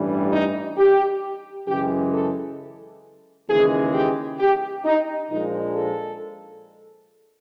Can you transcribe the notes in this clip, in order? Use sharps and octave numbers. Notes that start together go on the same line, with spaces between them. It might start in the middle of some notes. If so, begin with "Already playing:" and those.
Already playing: A1 G2 E3 G3
D#4
G4
F#2 C#3 E3 G#3 G4
A4
D#2 C#3 E3 G#3 G#4
G4
G4
D#4
A#1 A#2 F3 G#3 D#4
A4